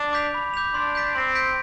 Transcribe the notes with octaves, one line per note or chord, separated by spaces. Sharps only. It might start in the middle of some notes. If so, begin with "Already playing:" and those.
Already playing: D4
D6 G6 B6 F7
B5
D6 G6 B6 F7
D4 C6
G6 B6 D7
C4 C6
G6 B6 D7